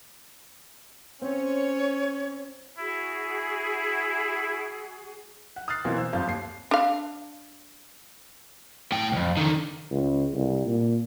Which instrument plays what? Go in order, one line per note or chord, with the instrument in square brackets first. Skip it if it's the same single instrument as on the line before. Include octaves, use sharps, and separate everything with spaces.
[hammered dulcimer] C4 [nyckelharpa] C#4 [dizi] C#5
[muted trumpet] E4 [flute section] F#4 G#4
[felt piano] F#5
D#6 F6 F#6 A6 C7
B2 E3 A#3 C4 F4
C5 E6
G#1 F2 F3 F5 G6
D#2 C7
[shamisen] D4 F5
[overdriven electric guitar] A2 G5
C2 F2
D3 D#3
[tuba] C#2
C2
A#2